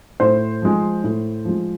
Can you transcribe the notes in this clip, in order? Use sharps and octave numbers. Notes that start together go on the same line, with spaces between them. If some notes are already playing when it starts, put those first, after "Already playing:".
A2 C5
F3 G#3
A2
F3 G#3